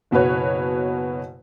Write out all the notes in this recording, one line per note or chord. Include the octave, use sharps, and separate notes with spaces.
F#1 B2 F#4 B4 C#5